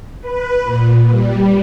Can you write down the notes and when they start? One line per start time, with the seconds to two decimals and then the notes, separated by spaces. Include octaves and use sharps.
0.21 B4
0.62 A#2
1.08 G3